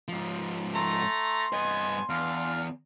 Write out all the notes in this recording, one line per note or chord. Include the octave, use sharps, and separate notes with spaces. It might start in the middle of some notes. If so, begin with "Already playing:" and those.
G#2 F3
A3 A#5 C6
G2 B3 D#5 G#5
E2 D4 F5 F6